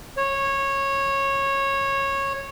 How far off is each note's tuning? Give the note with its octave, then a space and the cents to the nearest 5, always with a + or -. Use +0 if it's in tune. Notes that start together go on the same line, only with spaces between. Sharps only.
C#5 -15